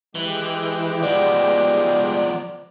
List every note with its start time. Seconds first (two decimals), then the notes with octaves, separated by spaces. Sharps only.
0.15 E3 G#3 G4
1.03 F3 B3 D5